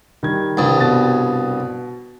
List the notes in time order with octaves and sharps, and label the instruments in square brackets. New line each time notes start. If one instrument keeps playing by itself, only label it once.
[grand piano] D#3 G3 G#6
[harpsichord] C2 G2
[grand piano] B2 A6